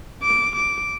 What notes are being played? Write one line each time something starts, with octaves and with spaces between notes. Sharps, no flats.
D6
D6